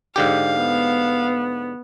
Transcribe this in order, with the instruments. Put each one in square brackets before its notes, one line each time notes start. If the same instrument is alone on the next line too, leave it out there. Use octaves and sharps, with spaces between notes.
[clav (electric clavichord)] G#2 D3 G4 [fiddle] F5
[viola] B3